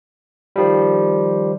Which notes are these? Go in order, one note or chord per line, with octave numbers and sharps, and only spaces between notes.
D#3 F3 G3